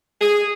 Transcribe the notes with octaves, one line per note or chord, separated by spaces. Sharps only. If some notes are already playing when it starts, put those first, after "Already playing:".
G#4